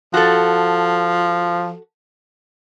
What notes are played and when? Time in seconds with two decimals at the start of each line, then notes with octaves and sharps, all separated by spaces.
0.14 F3 F#4 A4